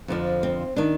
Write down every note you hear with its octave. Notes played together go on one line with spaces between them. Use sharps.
F2 D3 F3
C4
D#3 D4